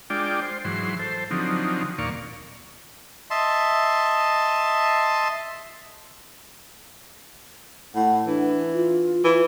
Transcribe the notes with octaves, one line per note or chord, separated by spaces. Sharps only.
G#3 D4 F4 D5 G5
C5
G#2 E3 F#3 C6
A4 C5
D3 F3 F#3 C4 D#4
D#2 A#2 A#3 D5 F5 C#6
D#5 E5 A5 C6
A2 F#5
E3 D4
F4
E3